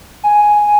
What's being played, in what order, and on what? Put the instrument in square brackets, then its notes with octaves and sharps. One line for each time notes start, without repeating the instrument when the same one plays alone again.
[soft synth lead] G#5